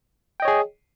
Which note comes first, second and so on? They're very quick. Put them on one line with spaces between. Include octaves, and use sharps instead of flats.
G5 D#5 C#5 G#4